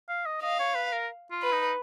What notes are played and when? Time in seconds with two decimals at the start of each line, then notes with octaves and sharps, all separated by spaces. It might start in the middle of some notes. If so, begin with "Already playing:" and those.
0.09 F5
0.26 D#5
0.42 D#5 F5
0.59 C#5
0.75 B4
0.92 A#4
1.31 F4
1.42 B4
1.53 D#4